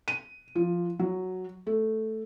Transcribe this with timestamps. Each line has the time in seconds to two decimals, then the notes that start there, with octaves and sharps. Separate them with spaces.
0.08 D#7
0.55 F3
0.99 F#3
1.67 A3